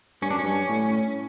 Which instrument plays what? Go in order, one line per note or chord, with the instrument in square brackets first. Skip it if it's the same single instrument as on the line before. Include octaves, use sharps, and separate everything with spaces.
[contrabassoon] G2 [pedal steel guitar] C#4
[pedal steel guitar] D4
[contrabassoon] F#2
[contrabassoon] G2 [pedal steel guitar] C#4
[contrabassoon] A2